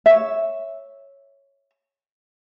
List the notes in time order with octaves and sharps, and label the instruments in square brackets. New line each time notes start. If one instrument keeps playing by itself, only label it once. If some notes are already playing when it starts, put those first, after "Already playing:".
[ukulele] C#5 E5